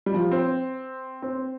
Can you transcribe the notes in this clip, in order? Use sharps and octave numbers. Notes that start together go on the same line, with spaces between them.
G3
F3
C4
C4